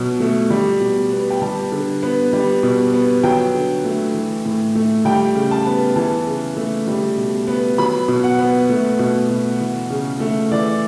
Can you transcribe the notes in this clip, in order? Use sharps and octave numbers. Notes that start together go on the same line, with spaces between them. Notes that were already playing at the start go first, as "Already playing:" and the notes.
Already playing: B2 F#3
A3
G3
B2
B3
G5
G3 A5
D3
B3
G3
B2
B3
F#3 G5
D3
A3
E3
A2
A3
G3 G5
C#3
A5
B3
E3 A5
C#3
A3
G3
B2
B3
F#3 B5
B2
F#5
B3
A3
B2
B2
E3
C#3
A3
E3 D5